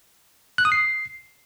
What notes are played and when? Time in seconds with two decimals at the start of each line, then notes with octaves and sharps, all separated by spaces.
0.58 F#6
0.65 D#6
0.72 C7